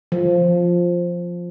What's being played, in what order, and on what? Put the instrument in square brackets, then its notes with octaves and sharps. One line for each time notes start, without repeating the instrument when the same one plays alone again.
[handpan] F3